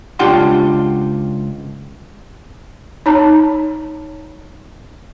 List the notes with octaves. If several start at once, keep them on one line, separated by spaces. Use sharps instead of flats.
C#2 D4 F4 G4 F#5 C6
D#4 C#5 A5 A#5